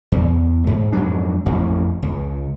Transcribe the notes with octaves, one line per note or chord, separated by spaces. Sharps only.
E2
G#2
F2 G#2 F#3 D4
A1 F2
C#2